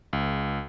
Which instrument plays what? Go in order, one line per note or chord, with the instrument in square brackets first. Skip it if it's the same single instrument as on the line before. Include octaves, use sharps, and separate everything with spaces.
[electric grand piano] C#2